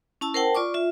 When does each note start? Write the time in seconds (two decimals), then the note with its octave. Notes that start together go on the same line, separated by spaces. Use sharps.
0.21 C#4 E4 A5 E6
0.34 A#4 C5 F#5 G5 A5
0.55 F4 D5 C#6 D6
0.74 F4 E5